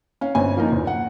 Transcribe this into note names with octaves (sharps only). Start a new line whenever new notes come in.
C#4 F5
G1 C4 C#4 G#5
F3 A#3 D#4
E2
F#5